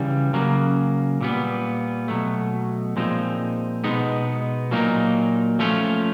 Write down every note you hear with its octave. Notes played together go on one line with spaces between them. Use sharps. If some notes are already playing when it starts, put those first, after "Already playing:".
Already playing: C#3 E3 G3
C#3 F#3 A#3
A#2 G3 B3
B2 F#3 A3
A#2 F3 G#3 C4 D#4
B2 G#3 B3 D#4
A#2 F#3 A#3 D#4
F3 A3 C#4 F4